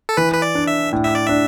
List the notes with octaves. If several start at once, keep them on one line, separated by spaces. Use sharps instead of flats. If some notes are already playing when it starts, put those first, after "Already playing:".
A4
E3 B4
B4
D5
D4
E5
A2
E5
D5
D4 E5